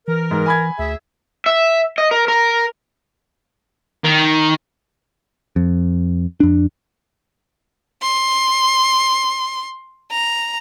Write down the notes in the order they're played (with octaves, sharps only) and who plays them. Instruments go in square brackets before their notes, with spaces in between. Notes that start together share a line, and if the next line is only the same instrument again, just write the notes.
[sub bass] E3 [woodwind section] A#4
[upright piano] G#2
G#5 B5 G#6
[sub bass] D2 [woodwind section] G#4 E5
[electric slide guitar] E5
D#5
A#4
A#4
[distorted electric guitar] D#3
[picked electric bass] F2
F2 D4
[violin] C6
A#5